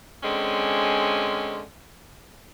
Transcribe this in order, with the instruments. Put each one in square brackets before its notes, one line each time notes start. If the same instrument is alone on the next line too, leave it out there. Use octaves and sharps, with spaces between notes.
[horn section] D3 G#3 C4 C#4